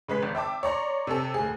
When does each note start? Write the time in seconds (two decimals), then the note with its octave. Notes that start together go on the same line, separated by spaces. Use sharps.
0.08 C#3 G#3 B4 B6
0.23 G#1
0.35 E5 G5 A5 D6
0.63 C#5 D5 A#5 C6
1.07 C3 A4
1.34 D2 G#4